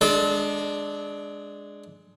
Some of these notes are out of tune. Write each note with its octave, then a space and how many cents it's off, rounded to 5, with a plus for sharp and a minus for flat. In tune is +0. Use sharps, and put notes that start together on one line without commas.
G#3 +0 D4 +0 A4 -35